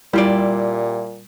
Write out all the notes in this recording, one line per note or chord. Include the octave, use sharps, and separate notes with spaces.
A#2 G3 E4 F4 D5